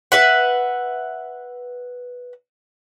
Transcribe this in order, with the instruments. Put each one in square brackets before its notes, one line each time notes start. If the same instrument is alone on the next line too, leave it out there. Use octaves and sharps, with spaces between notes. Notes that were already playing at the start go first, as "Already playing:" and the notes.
[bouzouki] B4 E5 F#5